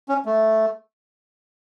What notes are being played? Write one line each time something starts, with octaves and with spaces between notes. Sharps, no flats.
C#4
A3